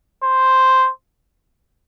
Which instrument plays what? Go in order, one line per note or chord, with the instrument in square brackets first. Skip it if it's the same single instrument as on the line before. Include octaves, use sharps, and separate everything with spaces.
[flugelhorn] C5